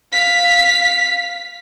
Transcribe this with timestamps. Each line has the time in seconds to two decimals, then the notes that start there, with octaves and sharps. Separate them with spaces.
0.13 F5 B6